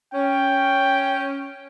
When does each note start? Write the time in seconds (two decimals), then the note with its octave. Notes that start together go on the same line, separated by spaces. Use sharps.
0.14 C#4 G5